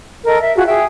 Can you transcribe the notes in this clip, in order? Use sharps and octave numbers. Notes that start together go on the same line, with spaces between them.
A4 A#4 D#5
E5
F4 F#4 G#4
G#4 E5 G5